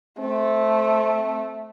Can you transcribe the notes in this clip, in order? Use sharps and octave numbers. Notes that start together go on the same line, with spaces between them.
A3 C4